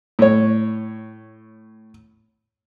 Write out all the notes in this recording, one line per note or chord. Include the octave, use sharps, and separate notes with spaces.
A2 C#5